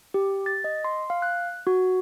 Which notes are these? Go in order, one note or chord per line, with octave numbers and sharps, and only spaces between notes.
G4
A6
D#5
C6
F5
F#6
F#4